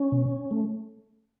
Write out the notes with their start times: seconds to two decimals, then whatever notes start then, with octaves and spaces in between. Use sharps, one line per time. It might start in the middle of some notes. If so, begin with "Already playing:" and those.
Already playing: C#4
0.12 B2
0.51 A3